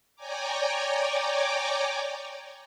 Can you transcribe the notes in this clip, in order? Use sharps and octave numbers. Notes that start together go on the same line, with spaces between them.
C#5 D5 G5 G#5 A#5 D6